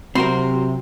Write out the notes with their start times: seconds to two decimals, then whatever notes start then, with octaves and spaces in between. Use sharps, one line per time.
0.15 C3 F#3 C4 F#4 A#4 C6